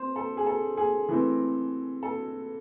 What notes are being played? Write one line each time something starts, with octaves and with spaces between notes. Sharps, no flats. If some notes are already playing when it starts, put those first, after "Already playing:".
Already playing: C4 C5
A4
G#4
A4
G#4
E3 A3 C4
A4